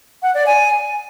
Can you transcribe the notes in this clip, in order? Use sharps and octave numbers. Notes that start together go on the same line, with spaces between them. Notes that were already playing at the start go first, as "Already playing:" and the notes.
F#5
D5
G#5